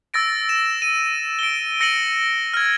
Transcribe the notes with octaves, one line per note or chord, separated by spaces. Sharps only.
E6 A6 A#6 D7
E7
D#7
D7 G7
E6 A#6 C#7 D#7 F#7
F6 G#6